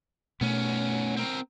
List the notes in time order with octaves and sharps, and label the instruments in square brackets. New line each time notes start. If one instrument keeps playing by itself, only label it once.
[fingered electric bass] B2 A3 [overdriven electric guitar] B3 C#4
[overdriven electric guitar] C4 A#4